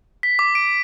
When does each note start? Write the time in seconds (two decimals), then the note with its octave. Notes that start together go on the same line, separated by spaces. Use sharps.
0.23 B6
0.39 D6
0.55 D7